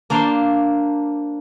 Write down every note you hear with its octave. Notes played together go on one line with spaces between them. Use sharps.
A#3 D4 C5 D5